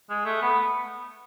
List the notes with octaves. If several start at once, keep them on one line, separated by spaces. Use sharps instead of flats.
G#3
A3
B3